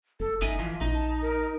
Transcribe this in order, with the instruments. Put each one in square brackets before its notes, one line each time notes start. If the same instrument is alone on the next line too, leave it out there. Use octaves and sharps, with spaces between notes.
[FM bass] F1 [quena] A4
[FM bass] G1 [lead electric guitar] D#4 G#5 [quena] E5
[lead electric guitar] E3 F3
[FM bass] A#1 [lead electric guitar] D#4
[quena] A5
A#4